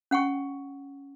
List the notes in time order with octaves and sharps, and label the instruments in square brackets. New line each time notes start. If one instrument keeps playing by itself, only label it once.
[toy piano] C#4 F#5 G5 C#6